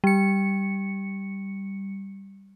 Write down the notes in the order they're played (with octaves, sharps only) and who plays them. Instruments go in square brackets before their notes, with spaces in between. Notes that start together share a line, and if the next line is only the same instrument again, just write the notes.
[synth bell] G3 C#7